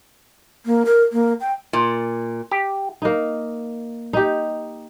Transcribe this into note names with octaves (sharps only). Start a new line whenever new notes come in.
A#3
A#4
A#3
G5
A#2
G4
A#3 D#4
D#4 G4